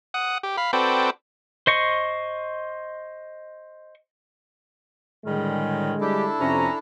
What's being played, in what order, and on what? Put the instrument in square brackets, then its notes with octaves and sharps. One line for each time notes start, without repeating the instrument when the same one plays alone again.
[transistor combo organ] F#5 D#6
G4
F5 B5
C4 F#4 A4 B4 D5 G5
[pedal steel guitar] C5 D#5 C#6
[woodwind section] A2 D#3 G3 [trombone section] D3 G#3
[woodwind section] G3 G4 [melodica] D4 E4 A4
[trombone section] F2 C3 [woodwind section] C#4 A#5